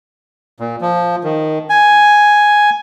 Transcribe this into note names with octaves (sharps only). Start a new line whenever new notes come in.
A#2
F3
D#3
G#5